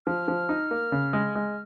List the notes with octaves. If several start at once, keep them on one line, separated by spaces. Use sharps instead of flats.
F3 F6
F3
D#4
A#3
C#3
G#3
G#3